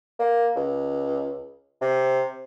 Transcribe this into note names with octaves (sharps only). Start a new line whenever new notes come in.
A#3
C#2
C3